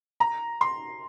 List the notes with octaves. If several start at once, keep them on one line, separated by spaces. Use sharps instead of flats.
A#5
C6